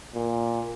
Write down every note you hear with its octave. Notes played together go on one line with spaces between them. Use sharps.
A#2